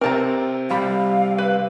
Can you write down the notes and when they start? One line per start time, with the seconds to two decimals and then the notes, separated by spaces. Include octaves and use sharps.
0.01 C3 C4 A#4 A5 A#5
0.70 C2 G3 F5 B5
1.38 B4